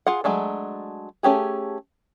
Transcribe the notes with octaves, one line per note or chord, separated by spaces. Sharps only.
F4 G#4 F#5
F#3 G#3 A3 D4
A3 C#4 G4 G#4